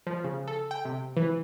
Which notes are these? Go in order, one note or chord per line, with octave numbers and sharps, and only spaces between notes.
F3
C#3
A4
G5
C3
E3